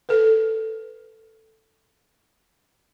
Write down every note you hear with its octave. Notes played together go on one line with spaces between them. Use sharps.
A4 B4